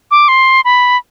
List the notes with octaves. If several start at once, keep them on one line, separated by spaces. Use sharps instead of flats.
D6
C6
B5